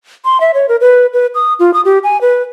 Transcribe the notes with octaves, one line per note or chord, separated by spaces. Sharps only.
C6
E5
C#5
A#4
B4
B4
D#6
F4
D#6
G4
G#5
B4